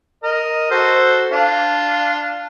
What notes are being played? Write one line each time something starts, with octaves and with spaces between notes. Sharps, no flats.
A#4 D#5
F#4 A4 C5
D4 F4